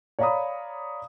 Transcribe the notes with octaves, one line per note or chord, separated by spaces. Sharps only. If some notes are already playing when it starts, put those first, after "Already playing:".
C#5 D5 F5 A#5 B5 D#6